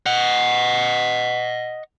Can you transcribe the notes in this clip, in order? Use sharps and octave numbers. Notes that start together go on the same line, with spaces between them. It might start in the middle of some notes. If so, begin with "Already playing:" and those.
D#5 F#5